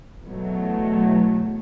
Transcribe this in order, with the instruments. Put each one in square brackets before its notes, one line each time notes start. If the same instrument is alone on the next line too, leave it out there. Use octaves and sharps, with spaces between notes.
[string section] E2 B2 F#3 A3